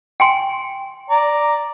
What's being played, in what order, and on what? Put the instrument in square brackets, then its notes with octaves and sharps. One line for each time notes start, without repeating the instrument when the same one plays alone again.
[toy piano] G5 G#5 C6
[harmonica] D5 A#5